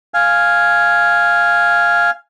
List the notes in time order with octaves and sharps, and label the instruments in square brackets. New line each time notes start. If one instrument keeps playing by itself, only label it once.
[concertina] F5 G#5